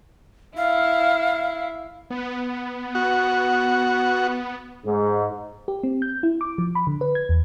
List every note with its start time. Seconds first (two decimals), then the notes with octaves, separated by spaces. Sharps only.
0.57 E4 F5
2.10 B3
2.95 F#4
4.86 G#2
5.68 G4
5.83 C4
6.02 G6
6.23 E4
6.41 D6
6.58 F3
6.75 B5
6.87 D3
7.01 B4
7.15 G#6
7.29 E2